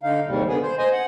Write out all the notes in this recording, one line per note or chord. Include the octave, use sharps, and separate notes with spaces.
D3 D#4 F5
D#2 G#2 C3 G3
D3 B3 G#4
C5
C5 D#5 G#5
F#5